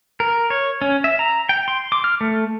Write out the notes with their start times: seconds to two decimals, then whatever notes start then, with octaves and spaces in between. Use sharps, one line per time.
0.20 A#4
0.50 C#5
0.82 C#4
1.04 E5
1.19 A#5
1.49 G5
1.68 C6
1.92 D6
2.04 F6
2.21 A3